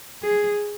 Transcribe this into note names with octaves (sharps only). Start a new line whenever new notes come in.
G#4